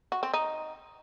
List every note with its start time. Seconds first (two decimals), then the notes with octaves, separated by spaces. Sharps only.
0.12 F#4
0.23 C4
0.34 D#4